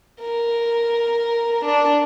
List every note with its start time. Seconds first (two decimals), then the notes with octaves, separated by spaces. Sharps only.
0.21 A#4
1.65 D4